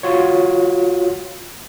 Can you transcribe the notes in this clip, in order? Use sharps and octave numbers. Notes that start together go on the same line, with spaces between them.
F4 F#4 C#5